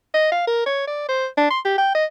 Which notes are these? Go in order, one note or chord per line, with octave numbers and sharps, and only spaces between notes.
D#5
F5
A#4
C#5
D5
C5
D4
C6
G4
G5
D#5